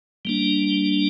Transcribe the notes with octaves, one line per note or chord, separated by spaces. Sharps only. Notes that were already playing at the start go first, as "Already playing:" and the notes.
G3 A#3 D4